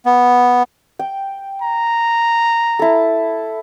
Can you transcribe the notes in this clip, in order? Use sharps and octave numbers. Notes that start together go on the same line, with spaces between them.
B3
G5
A#5
E4 A4